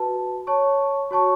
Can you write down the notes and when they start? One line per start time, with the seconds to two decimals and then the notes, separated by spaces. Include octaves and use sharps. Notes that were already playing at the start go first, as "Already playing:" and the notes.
Already playing: F#4 B4 A5
0.47 C#5 A5 C#6
1.11 F#4 C#5 A5 C#6